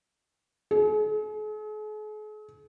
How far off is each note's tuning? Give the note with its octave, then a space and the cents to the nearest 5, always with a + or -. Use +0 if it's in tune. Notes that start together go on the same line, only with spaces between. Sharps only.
G#4 +45